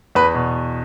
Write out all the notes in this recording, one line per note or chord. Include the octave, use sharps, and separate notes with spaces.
E2 B4
B2